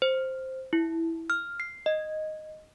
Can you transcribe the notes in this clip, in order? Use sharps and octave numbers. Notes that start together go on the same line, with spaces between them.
C5
E4
F6
C7
D#5